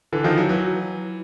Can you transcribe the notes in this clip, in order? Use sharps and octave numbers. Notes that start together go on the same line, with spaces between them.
D3 E3
D#3 F3
E3 F#3
E3 F#3